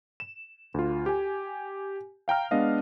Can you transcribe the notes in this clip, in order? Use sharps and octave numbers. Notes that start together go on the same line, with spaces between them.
E7
D2 F4
G4 G#5
F5 G5 A#5 F6
G#3 B3 D4 D#5 F5